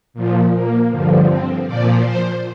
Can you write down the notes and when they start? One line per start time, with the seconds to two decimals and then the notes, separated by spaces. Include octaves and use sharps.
0.14 A#2 F3
0.52 A#3
0.89 G2 D3 F3
1.28 C4
1.67 A#2 F3 D5
2.05 C5